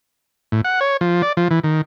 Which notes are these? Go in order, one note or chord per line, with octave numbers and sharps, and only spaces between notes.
A2
F#5
C#5
F3
D5
F3
E3
D#3